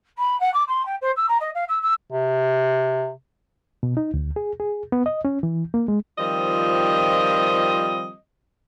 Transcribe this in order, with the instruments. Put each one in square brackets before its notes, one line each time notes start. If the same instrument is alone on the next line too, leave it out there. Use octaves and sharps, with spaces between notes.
[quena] B5
F#5
D6
C6
G5
C5
E6
A#5
D#5
F5
E6
E6
[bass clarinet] C3
[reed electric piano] B2
D#4
D2
G#4
G#4
B3
D#5
C#4
E3
A#3
G#3
[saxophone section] D#3 F3 G3 C4 F4 D#5